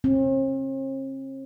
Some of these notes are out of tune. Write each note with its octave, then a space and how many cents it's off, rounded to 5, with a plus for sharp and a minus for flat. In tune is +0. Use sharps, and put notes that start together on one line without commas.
C4 +45